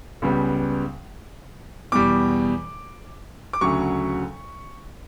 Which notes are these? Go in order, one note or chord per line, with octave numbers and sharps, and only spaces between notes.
C#2 C#3 G3 B3
E2 B2 G3 D6
D6
D2 C#3 F#3 C#6